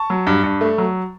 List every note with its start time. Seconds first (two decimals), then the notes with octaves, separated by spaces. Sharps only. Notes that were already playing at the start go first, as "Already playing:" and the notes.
Already playing: A5 C#6
0.10 F#3
0.27 G2
0.44 G2
0.61 A3
0.78 F#3